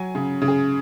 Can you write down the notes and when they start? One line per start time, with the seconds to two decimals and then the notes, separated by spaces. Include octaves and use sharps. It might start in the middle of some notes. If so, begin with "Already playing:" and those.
Already playing: F#3 G#5
0.15 C#3
0.42 C#3
0.48 G#4